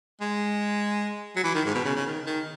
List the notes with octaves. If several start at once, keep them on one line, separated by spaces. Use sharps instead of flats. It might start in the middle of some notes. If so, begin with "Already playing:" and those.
G#3
F#3
E3
D#3
G#2
B2
C#3
C#3
D#3
D#3